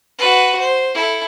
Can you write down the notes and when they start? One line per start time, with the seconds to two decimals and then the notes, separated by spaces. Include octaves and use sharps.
0.19 F#4 B4
0.60 C5
0.95 E4 A4